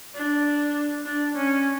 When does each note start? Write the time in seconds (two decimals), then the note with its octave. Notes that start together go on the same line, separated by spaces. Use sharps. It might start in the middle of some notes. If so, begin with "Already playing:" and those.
0.15 D4
1.05 D4
1.36 C#4